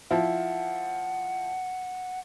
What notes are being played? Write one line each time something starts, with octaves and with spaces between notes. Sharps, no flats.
F3 E4 F#5